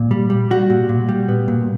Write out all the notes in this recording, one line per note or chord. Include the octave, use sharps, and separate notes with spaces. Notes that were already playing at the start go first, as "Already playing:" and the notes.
Already playing: A#2
G3
G3
G3 F#4
A#2
A#2
G3
B3
A#2